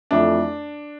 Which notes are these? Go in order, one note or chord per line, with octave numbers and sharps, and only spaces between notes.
F2 E3 A3 D4